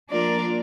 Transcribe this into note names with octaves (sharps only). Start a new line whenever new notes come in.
F3 A#3 D4 F4 A#4 D5